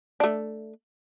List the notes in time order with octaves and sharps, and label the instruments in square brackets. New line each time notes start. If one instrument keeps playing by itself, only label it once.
[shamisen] A3 D4